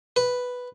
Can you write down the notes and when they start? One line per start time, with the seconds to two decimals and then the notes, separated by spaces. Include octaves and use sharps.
0.16 B4